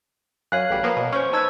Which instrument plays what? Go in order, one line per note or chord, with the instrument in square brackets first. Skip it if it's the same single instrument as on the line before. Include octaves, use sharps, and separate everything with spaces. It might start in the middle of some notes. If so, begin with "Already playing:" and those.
[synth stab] F#2 [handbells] C#5 F5 F#6
[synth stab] A1 G3
F3 A#3 B3
B2
[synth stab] C#4 [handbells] C5 C#6
[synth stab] D#4 B4 [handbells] A5 E6 G#6